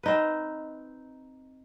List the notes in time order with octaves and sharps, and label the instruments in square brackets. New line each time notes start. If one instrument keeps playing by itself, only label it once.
[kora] C4 D#4 B4